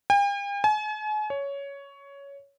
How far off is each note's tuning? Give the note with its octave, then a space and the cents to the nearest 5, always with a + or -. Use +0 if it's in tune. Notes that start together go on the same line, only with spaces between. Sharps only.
G5 +45
G#5 +40
C#5 +10